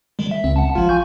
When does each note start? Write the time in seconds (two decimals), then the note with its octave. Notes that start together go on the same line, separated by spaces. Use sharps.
0.19 D#3 G3 G#3
0.31 E5
0.44 C#2 C4
0.56 F#5 A5
0.75 G#1 F3 F4
0.89 G#5 C#6 G6